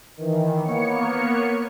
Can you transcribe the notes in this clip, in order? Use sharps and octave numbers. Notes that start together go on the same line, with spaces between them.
D#3 E3
A#3 B3 C#5 C#7